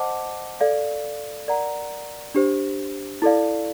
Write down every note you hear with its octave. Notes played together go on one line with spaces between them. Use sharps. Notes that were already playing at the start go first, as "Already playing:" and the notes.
Already playing: C5 D#5 F#5 A5 D6
A4 D5 F5
A#4 D5 F#5 A#5
D4 G4 C5
E4 A4 D5 F5